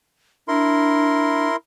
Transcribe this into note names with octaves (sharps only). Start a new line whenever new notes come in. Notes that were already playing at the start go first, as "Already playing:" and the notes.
D4 E4 A#4 C6